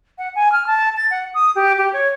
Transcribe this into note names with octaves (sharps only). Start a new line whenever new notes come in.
F#5
G#5
F6
A5
A6
F#5
D#6
G4
G4
C#5